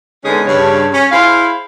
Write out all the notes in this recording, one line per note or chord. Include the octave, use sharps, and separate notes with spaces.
D3 G#3 B3 C#4 D#4 G#4
G2 C#3 C#5
C#4
E4 G#4 C5 F5